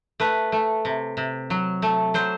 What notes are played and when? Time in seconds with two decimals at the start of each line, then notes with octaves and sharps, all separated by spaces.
0.20 A3 B4
0.52 A3
0.85 C3
1.17 C3
1.50 F#3
1.82 A3
2.14 F#3 C5